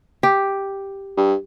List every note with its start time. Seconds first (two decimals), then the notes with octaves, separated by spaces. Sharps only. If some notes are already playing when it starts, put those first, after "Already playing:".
0.23 G4
1.17 G2